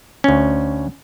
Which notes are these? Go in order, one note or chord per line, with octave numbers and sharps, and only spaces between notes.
D2 C#4